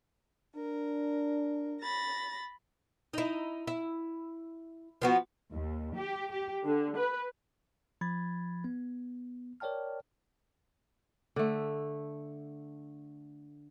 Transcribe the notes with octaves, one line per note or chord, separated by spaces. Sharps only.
D4 A#4
B5 A6 A#6
D#4 E4
E4
F3 B3 F#4
D#2
G4
G4
D3
B4
F3 B5 G#6 A6
B3
A#4 C#5 D5 G5 A5 F6
D3 A3